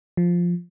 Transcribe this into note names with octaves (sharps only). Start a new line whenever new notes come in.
F3